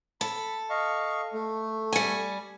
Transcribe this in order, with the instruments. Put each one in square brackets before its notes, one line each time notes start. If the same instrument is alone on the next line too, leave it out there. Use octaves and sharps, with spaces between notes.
[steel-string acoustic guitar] A4 [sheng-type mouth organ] B5
[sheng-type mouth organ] D#5 F5 C#6
A3
[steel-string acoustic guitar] G3 G#5